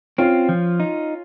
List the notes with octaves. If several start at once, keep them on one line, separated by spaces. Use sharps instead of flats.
C4 C#4 F4
F3
D#4